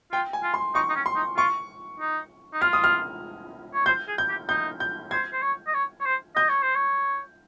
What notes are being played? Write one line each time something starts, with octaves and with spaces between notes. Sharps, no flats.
F4 G5
G#5
F4
C6
D#4 C#6
D#4
C#4
C6
D#4
F4 C#6
D#4
D#4
F4 F6
D#6
F6
C#5
C5 G6
G#4
G6
G4
D#4 G6
G6
C5 G#6
C5
C#5
D#5
C#5
C#5
C5
D#5 G6
C#5
C5
C#5